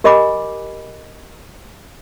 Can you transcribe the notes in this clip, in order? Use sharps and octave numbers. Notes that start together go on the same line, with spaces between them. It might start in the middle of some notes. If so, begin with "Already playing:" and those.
G4 A#4 D#5 G#5 B5 D6